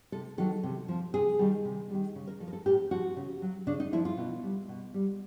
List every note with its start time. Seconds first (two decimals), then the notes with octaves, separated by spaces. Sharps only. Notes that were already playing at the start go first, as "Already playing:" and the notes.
0.12 C3 A4
0.38 D#3 F#3 A4
0.63 C3
0.88 F3
1.14 C3 G#4
1.39 D#3 G3
1.65 C3
1.90 D#3 G3
2.15 C#3
2.27 A#4
2.40 F3 A4
2.48 A#4
2.53 A4
2.66 A2 G4
2.91 F3 F#4
3.17 C#3
3.42 F#3
3.67 C#3 D4
3.80 D#4
3.93 F3 E4
4.05 F4
4.17 B2
4.43 G3
4.69 B2
4.94 G3